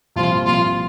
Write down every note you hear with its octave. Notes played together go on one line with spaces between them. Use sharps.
C2 A#2 F3 C4 F4
C2 A#2 F3 C4 F4